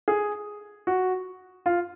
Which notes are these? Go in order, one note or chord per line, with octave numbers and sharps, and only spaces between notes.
G#4
F#4
F4